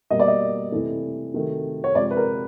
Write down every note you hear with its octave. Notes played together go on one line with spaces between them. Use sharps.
B2 G3 A#3 D#5
D5
D#5
C3 E3 A3
C3 D#3 F#3 A3
C#5
C3 F3 G#3 D5
B4
A#4